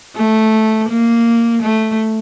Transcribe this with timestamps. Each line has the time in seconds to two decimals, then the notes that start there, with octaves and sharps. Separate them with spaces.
0.16 A3
0.89 A#3
1.62 A3